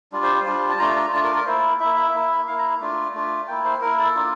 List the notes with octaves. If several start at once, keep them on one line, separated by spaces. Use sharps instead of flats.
G3 D4 F4
C5
C5
G3 D4 F4
A5
A3 D4 F4 A#5
A#5
A3 D4 F4 A5
A#4
A#4
A#3 E4 C5
A#3 E4 E5
E5
A#3 E4
A#3 E4 F5
A#5
A3 D4 F4
A3 D4 F4
A#3 E4 G5
C5
A#3 E4 A#4
A4
A#3 D4 F4